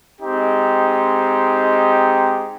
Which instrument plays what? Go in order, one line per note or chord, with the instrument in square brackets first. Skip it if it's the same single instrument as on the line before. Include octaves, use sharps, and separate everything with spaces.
[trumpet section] G#3 C4 D#4 G4